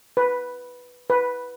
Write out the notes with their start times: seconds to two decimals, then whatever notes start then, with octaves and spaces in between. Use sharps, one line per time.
0.17 B4
1.10 B4